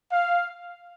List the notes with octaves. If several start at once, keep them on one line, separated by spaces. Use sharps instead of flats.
F5